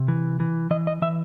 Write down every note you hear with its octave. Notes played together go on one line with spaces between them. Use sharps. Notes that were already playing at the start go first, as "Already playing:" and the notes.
Already playing: C3
E3
E3
E3 D#5
D#5
E3 E5